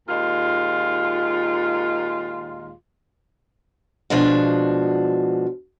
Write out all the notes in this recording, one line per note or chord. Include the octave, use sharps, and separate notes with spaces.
D#2 A#2 G#3 F4
B2 F3 G#3 D4 F4 F#4